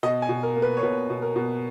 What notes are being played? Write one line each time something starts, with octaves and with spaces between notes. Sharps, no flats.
B2 D#5
G#5
B2
A#4
A#3
B4
C#5
B2 B4
B2
A#4
B2